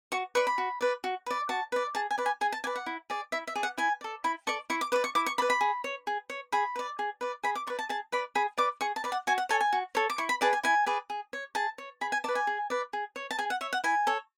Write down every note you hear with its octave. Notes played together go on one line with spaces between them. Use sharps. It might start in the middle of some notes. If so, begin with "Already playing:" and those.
F#4 C#6
B4 D5 C#6
B5
F#4
B4 D5
F#4
B4 D5
F#4 A5
B4 D5
G#4 A5
G#5
B4 D5
G#5
G#4 G#5
A5
B4 D5 G#5
F#5
E4
G#4 D5
E4 E5
E5
G#4 D5
F#5
E4 G#5
A4 D5
E4 B5
A4 D5 C#6
E4 C#6
D6
B4 D5 D6
C#6
E4 D6
C#6
B4 D5 B5
B5
G#4
C#5
G#4
C#5
G#4 B5
B4 D5
G#4
B4 D5
G#4 B5
D6
B4 D5 C#6
A5
G#4 A5
B4 D5 B5
G#4 B5
B4 D5 D6
G#4 C#6
A5
B4 D5
F#5
F#4 G#5
F#5
A4 C#5 G#5
G#5
F#4
A4 C#5
D6
E4 C#6
B5
G#4 B4 D5 A5
G#5
E4 G#5
G#4 B4 D5
G#4
C#5
G#4 A5
C#5
G#4 B5
G#5
B4 D5 A5
G#5
G#4
B4 D5
G#4
C#5
A5
G#4 G#5
F#5
C#5 E5
F#5
E4 G#5
A4 C#5